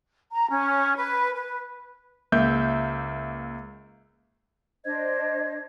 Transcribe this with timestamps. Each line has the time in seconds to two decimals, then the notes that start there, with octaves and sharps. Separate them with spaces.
0.32 A#5
0.49 C#4
0.97 B4
1.33 B4
2.32 C#2 A#3 E5 G6
4.84 D4 C5 D#5 G#6